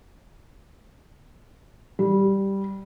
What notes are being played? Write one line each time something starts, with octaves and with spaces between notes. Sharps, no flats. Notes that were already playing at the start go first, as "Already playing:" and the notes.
G3